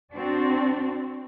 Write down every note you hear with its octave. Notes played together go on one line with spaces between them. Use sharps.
C4 D4 F#4 D5